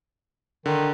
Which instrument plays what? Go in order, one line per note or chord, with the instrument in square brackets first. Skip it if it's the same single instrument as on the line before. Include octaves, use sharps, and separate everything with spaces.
[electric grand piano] D3 [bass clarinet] D#3